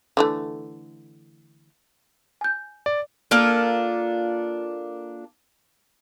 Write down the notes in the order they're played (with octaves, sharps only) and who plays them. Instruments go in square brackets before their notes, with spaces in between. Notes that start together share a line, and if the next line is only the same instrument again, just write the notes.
[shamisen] D3 E3 A3
[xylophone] G#5 G6
[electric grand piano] D5
[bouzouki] A#3 D4 F4 A4